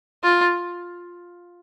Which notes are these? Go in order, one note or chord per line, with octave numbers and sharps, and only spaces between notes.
F4